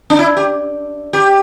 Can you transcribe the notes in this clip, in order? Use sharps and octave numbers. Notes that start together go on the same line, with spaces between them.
D4
E4
G4
G4